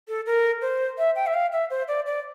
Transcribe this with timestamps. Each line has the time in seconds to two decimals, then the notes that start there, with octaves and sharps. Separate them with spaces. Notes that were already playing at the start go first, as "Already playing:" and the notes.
0.08 A4
0.26 A#4
0.62 C5
0.98 E5
1.16 G5
1.27 E5
1.34 F5
1.52 E5
1.70 C5
1.88 D5
2.06 D5